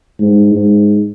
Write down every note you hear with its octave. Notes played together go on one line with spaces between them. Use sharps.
G#2
G#2